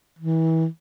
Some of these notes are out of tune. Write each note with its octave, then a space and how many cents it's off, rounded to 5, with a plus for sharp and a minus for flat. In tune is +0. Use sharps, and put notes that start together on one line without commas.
E3 -30